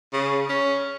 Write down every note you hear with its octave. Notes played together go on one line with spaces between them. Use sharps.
C#3
C#4